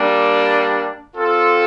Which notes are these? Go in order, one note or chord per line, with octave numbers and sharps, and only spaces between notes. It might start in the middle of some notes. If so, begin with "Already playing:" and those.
Already playing: G3 A#3 D4
C4 F4 A4